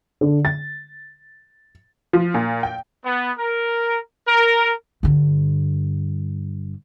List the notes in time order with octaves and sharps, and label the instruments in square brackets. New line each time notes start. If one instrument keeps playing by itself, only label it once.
[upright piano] D3
A6
[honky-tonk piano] F3
A#2
G5
[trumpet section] B3
A#4
A#4
[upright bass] G2 D3